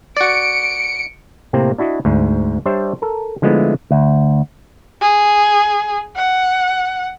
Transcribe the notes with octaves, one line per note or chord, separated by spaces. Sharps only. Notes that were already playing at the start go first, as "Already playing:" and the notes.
F#4 D5 C#7 D7
A2 C3 A#3 C4
D4 E4 F#4 D#5
D2 G#2
G3 D4 C5 C#5 E5
A4 A#4
D3 F3 G#3 A3 B3 E4
D2
G#4
F#5